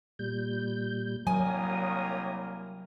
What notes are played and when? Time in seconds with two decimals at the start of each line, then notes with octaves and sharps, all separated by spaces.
0.19 A#2 G3 G6
1.27 C2 F#3 A#3 A#4 C#5 G#5 D#6